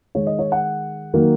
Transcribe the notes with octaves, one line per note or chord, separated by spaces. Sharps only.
D#3 G#3 C#5
D#5
C#5
F#5
D#3 F#3 A#3